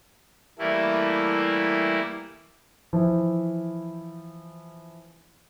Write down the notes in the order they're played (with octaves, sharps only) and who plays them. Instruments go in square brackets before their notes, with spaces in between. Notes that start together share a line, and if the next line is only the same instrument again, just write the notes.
[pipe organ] E3 G3 A3 A#3 E4
[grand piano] E3 F3 E4